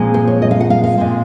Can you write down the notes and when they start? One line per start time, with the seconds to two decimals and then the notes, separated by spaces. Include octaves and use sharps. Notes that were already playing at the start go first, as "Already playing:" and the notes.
Already playing: A#2 F3 G#3 C4
0.14 C5
0.27 C#5
0.42 D#5
0.51 F5
0.60 F#5
0.70 F5
0.84 F5
0.98 A#2 G#3 C4